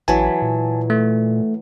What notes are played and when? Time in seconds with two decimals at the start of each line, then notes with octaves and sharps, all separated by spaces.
0.08 A1 E3 F#3 G#5 A5 B5
0.42 A#2
0.90 A3